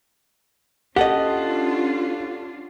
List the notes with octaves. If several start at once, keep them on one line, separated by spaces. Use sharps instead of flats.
C#4 D4 F4 G4 A4 D#5 F#5